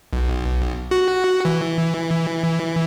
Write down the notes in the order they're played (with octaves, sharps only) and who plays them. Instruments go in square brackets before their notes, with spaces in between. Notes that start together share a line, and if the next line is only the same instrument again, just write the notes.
[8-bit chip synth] B1
F#4
E3